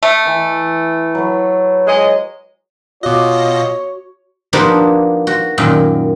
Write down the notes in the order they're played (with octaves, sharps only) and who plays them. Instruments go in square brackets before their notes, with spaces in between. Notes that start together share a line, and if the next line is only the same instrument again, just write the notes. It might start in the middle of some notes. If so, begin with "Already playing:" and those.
[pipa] A3
[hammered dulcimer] E3
F#3 B4
[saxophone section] G#3 D#5
[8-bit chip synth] B2 D#5 [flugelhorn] F4 [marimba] F#4 D6 [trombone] C#5
[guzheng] F3 A#3 B3 D4 D#4 G4
F#4
F#2 A#2 D#3